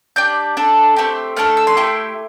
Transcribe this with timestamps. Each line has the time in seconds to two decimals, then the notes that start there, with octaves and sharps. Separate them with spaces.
0.16 D4 G4 G6
0.57 D4 A4
0.96 A3 C4 G4
1.36 A3 D4 A4 F6
1.57 E6
1.67 C6
1.77 A3 E4 G4